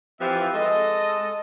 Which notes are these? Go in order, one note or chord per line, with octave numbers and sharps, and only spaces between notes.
E3 F3 C4 G4 B4 E5
G#3 A4 D#5